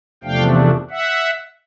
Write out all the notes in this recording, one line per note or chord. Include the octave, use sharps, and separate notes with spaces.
E2 C3 F3 A3 D4 F5 G5
E5 F#5